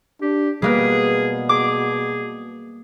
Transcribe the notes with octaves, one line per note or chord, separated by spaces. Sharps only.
D4 G4
B2 G3 A#3 G#4 B4
G#4 D6